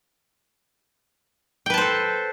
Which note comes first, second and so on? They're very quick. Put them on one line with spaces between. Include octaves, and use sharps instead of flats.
G5 B4 A5 C5 A4